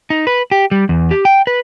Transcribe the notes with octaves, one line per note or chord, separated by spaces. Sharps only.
D#4
B4
G4
G3
E2
G4
G5
B4